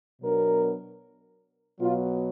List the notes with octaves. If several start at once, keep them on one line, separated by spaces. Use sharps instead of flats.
B2 F#3 B3 D4 A#4
B2 F#3 B3 F4